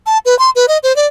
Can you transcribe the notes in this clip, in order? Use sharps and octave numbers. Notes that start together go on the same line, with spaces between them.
A5
B4
C6
B4
D#5
C5
D5